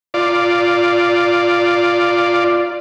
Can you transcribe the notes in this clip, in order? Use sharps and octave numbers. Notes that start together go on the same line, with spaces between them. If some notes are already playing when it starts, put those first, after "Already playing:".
F4 D5